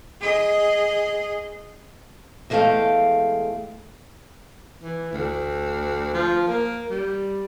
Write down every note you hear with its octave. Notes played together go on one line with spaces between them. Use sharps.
G#4 D#5
E2 G#3 A3 A4 F5 G5
E3
D2
F3
A#3
G3